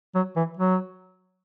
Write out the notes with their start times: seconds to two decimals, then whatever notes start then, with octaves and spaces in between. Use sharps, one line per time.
0.15 F#3
0.36 E3
0.57 F#3